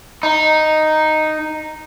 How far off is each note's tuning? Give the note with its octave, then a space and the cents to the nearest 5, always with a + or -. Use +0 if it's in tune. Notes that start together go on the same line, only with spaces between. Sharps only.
D#4 -5